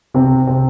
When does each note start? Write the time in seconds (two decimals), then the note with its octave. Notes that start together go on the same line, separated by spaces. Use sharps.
0.14 C3 C4
0.47 C3 C4